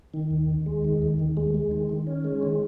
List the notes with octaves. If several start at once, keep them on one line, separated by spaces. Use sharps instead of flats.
D#3
D#2
D#2
G#3
D#3
D#2
D#2
G#3
G#3
D#3
D#3
C#4
G#3
D#3